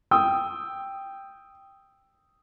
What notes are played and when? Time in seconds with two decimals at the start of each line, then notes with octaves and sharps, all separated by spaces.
0.11 G5 D#6 E6